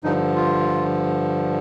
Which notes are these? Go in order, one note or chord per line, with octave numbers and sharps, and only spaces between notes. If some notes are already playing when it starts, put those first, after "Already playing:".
G2 D3 F3 D#4
F4